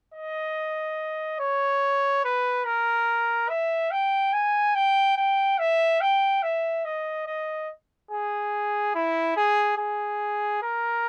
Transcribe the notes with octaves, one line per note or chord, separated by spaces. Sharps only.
D#5
C#5
B4
A#4
E5
G5
G#5
G5
G5
E5
G5
E5
D#5
D#5
G#4
E4
G#4
G#4
A#4